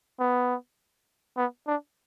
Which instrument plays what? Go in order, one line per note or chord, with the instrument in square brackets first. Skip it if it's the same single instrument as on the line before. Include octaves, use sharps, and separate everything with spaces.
[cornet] B3
B3
D4